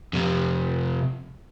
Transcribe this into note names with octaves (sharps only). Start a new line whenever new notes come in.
F2 C3